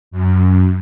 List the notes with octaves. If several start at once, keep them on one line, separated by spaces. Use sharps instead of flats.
F#2